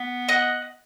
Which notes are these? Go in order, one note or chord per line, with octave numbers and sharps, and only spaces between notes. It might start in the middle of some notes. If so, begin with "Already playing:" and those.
Already playing: B3
D#5 F#5